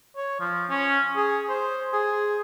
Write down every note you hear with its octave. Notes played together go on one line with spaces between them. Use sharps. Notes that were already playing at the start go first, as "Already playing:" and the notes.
C#5
F3
C#4
G#4
C5
G#4